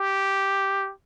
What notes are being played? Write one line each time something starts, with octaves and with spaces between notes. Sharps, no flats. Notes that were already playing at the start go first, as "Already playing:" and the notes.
Already playing: G4